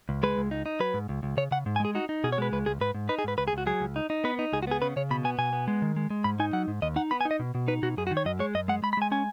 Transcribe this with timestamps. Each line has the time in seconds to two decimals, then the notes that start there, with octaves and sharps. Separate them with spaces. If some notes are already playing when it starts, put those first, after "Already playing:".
0.09 C#2
0.23 G#3 B4
0.38 C#2
0.51 D#4
0.66 D#4
0.80 F#3 B4
0.94 G#2
1.09 C#2
1.23 C#2
1.37 C#3 C#5
1.51 C#3 F#5
1.66 G#2
1.76 G#5
1.80 G#3 G#4
1.95 D#4 F#4
2.09 D#4
2.24 B2 G#4
2.32 C#5
2.38 G#3 B4
2.53 C#2 B4
2.66 C#2 G#4
2.81 G#2 B4
2.95 G#2
3.09 D#4 B4
3.19 G#4
3.24 G#2 B4
3.38 C#2 B4
3.48 G#4
3.53 C#2 F#4
3.66 F#3 G#4
3.81 C#2
3.96 D#4
4.10 D#4
4.24 B3 B4
4.39 D#4
4.53 C#2 G#4
4.63 F#4
4.67 B3 G#4
4.82 C#3 B4
4.96 C#3 C#5
5.11 B2 B5
5.24 B3 G#5
5.38 B2 G#5
5.53 B3
5.68 G#3
5.82 D#3
5.96 G#3
6.10 G#3
6.24 G#2 B5
6.40 D#4 G#5
6.53 F#3 F#5
6.68 G#2
6.82 D#2 D#5
6.96 D#4 F#5
7.11 B3 B5
7.21 G#5
7.25 D#4
7.31 D#5
7.40 B2
7.55 B2
7.68 D#4 B4
7.83 B2 F#4
7.97 F#2 G#4
8.07 F#4
8.11 D#3
8.17 C#5
8.25 F#2 D#5
8.39 G#3 C#5
8.55 F#2 D#5
8.68 G#3 F#5
8.83 G#3 B5
8.93 B5
8.97 G#3 G#5
9.12 C#4 G#5